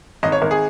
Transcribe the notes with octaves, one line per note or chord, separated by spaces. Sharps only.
G#1 D#5
C#5
G#1 A#4
G#4